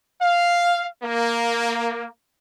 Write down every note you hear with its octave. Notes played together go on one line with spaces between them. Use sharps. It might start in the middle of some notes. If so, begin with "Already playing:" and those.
F5
A#3